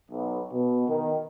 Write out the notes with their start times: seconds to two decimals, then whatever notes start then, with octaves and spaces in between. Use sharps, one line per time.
0.11 B1
0.53 B2
0.89 D#3